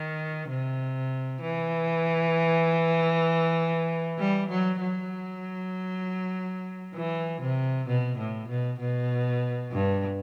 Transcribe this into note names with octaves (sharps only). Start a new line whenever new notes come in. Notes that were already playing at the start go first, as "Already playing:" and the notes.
Already playing: D#3
C3
E3
G3
F#3
F#3
E3
C3
B2
A2
B2
B2
G2